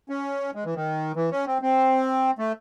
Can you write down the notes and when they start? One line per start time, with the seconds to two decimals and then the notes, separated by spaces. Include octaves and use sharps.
0.09 C#4
0.55 G#3
0.65 E3
0.75 D#3
1.16 E3
1.31 C#4
1.47 C4
1.62 C4
2.39 A3